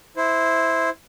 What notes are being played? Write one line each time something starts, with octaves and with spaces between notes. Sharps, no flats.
E4 C5